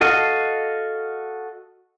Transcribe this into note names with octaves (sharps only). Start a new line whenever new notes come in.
F#4 A4 D#5 F5